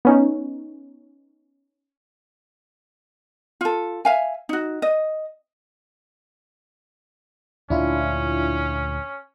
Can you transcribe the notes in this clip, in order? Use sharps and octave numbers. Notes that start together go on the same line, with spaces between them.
B3 C#4 D#4
F4 A4
E5 F5 G#5
D#4 F#4
D#5
D2 A#2 C#4 D4 E4 F4